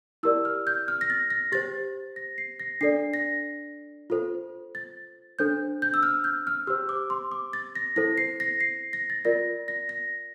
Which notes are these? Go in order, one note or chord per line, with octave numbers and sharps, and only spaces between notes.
E4 G4 A#4 D5 E6
F6
G6
F6
A#6
A6
A#6
G4 C5 A6
A#6
C7
A#6
D4 A4 D5 C7
A#6
F4 A4 C5
A6
D4 A4 C5 G6
G6
E6
F6
G6
F6
G4 C5 E6
D6
C6
D6
A6
A#6
E4 A4 C5 A#6
C7
A#6
C7
A#6
A6
F4 A#4 D5 A#6
A#6
A#6